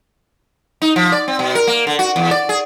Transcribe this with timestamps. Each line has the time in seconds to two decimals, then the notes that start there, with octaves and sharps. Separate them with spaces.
0.82 D#4
0.96 F3
1.12 D5
1.28 C4
1.39 B2
1.55 A#4
1.67 A#3
1.87 D3
1.99 F#4
2.16 E2
2.31 D5
2.49 G#4